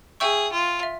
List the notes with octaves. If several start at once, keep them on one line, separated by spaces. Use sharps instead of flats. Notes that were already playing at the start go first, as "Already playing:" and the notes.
G#4 E5 G5 C#6 E6 G6
F4
E5